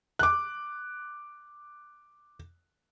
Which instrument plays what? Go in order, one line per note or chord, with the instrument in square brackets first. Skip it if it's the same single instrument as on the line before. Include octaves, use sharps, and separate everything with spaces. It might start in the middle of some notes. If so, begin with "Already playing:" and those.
[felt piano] D6 F#6